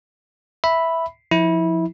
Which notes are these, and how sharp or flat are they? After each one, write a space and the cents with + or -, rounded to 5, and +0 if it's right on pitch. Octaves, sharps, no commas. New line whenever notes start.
E5 -5 B5 +0
F3 +0 E4 -20